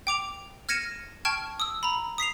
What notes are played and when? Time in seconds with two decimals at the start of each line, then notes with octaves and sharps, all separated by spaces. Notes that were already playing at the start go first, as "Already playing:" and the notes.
0.07 G5 D6 F7
0.69 F6 G#6 A#6 C#7 D#7 E7
1.25 G5 A5 C#6 F6 G#6
1.60 D#6 E6
1.83 A#5 B5
2.18 D#6 B6 C7 F7